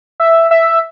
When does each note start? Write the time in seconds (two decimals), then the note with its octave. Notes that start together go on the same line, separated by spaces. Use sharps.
0.20 E5
0.51 E5